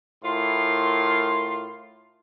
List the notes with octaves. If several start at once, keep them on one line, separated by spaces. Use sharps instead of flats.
A2 F4 A#4 C6